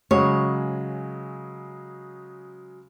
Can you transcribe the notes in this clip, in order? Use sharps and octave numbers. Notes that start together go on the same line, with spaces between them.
C#3 F#3 G#3 C#5